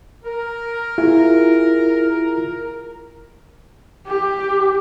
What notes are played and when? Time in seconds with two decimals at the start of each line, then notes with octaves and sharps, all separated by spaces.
0.24 A#4
0.98 E4 F4 G#4
4.07 G4